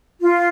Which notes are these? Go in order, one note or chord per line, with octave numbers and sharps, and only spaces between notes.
F4